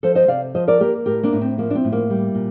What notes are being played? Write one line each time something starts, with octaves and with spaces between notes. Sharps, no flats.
F3 A4 C5
C5 D#5
C3 D5 F5
F3 C5 D#5
A#4 D5
A#3 G4 A#4
A2 G4 A#4
A#3 D4
A2
C4
F3 A#3
D4
C4
A2
A#3
G3
A#2